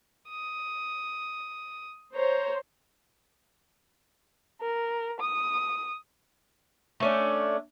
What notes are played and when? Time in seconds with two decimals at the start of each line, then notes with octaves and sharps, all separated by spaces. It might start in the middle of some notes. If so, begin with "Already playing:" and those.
0.29 D#6
2.15 C5 C#5 A#5
4.62 A#4
5.20 D#6
7.00 A3 C#4 D4